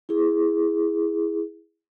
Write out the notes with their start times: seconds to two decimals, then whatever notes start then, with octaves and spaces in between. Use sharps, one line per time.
0.09 E4 G#4